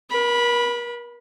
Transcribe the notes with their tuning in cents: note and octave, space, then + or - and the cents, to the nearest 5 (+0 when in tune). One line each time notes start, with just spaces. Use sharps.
A#4 +40 B5 -10